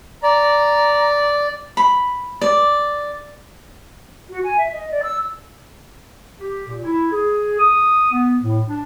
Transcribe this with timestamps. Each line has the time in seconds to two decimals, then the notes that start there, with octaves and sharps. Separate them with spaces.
0.23 D5 A#5
1.77 B5
2.41 D5
4.29 F#4
4.44 G#5
4.58 E5
4.72 D#5
4.91 D5
5.03 E6
6.41 G4
6.68 A#2
6.84 E4
7.12 G#4
7.59 D#6
8.12 B3
8.43 A2
8.68 D4